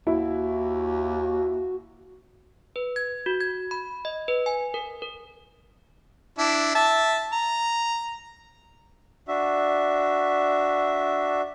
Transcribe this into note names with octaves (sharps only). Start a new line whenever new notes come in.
D#2 E4 F#4
B4
G#6
F#4
G#6
B5
D#5
B4
G#5
A#4
A#4
D4 E4
E5 A5
A#5
D4 F#4 E5